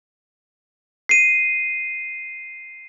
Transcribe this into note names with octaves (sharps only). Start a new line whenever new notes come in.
C7 D#7